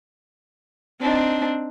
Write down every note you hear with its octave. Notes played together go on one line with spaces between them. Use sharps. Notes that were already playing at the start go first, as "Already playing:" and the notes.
C4 D4 D#4